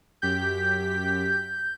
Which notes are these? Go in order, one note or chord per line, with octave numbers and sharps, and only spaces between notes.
F#2 G4 G6 B6